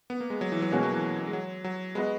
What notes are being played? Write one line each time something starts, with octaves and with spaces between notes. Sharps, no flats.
B3
A#3
G#3
F#3
E3
F#3
B2 G#3 A#3 C#4 F#4
F#3
E3
G#3
F#3
F#3
G#3 B3 F#4 B4 D#5